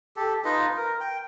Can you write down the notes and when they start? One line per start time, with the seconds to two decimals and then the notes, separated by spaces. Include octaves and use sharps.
0.16 G4 A4
0.45 D#4 F4 B4 D#5
0.76 A#4
1.00 G5